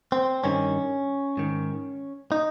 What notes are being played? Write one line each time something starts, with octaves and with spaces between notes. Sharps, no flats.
C4
G2 D#3 C#4
G#2 D#3
D#4